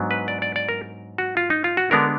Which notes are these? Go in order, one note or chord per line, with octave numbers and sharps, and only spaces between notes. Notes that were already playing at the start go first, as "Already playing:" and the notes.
Already playing: G#2 F#3 B3 D4
B4
D5
D5
D5
A#4
F#4
F4
D#4
F4
F#4
D3 G#3 B3 D4 A#4